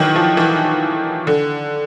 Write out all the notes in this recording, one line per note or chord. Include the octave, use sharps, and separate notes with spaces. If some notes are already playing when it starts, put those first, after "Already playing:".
Already playing: D#3 E3 F#3
F3
E3
D3